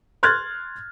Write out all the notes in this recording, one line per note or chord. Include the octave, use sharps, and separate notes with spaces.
C6 F6 F#6 G#6 A6